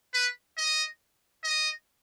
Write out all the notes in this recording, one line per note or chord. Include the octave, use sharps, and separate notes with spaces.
B4
D#5
D#5